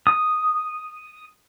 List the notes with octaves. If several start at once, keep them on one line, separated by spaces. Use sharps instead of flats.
D#6